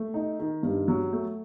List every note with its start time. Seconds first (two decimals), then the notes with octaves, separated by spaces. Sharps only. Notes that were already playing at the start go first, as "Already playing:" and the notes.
Already playing: A3
0.14 D#4
0.39 D#3
0.63 G2
0.88 F#3
1.13 A3